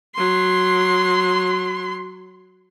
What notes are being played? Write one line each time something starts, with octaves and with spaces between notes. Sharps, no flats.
F#3 C6